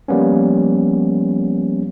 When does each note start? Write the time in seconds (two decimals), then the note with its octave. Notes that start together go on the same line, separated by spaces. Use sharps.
0.08 F3 G3 A#3 B3 C#4